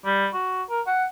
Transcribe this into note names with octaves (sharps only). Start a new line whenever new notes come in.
G3
F#4
A#4
F#5